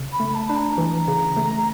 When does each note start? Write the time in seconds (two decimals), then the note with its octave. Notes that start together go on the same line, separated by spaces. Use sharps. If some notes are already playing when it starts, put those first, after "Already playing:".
Already playing: C#3
0.12 B5
0.20 A3
0.35 A5
0.50 D4
0.56 A#5
0.78 E3
1.08 C#3
1.37 A3